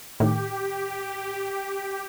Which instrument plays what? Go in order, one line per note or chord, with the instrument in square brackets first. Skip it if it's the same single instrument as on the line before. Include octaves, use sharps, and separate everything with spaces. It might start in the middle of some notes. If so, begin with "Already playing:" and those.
[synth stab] A2 D#3 [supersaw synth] G4